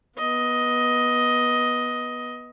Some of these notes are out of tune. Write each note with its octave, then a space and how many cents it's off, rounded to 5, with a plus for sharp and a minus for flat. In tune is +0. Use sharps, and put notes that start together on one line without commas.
B3 -15 D#5 +10